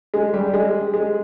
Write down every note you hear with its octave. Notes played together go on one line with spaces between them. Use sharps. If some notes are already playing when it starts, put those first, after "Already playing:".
G#3
G3
G#3
G#3